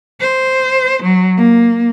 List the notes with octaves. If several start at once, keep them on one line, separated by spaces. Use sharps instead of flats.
C5
F#3
A#3